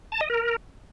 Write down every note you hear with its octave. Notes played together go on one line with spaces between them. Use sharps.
A5
D#5
A#4